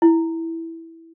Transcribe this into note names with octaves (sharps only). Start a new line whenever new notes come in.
E4